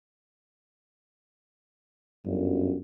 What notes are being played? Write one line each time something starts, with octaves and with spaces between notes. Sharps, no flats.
G1 F#2